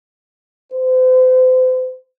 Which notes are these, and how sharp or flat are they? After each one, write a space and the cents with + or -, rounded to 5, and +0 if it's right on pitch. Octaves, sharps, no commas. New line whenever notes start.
C5 -40